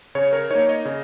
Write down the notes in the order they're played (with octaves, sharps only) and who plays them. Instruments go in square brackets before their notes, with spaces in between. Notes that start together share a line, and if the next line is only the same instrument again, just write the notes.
[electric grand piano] C#3 C#5
A#4
A#3 D#4 C#5
D#5
C#3